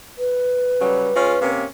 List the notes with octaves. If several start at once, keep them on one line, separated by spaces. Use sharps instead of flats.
B4
C#3 F#3 G3
G#3 C#4 F4
C3 A#3 C#4